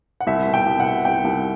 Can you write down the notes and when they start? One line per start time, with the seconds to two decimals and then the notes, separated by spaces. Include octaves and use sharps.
0.21 F#5
0.27 C2 E5
0.47 B2
0.54 G5
0.66 C2
0.80 F#5
0.86 B2
1.05 C2 G5
1.25 C2